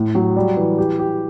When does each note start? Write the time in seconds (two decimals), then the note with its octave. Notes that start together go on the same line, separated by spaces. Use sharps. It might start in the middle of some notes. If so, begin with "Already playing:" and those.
Already playing: A2
0.15 F#3
0.36 G3
0.57 E3
0.78 G4
0.99 G4